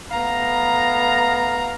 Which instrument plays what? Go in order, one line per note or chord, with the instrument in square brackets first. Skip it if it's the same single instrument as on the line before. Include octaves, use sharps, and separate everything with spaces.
[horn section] A3 B3 F5 A#5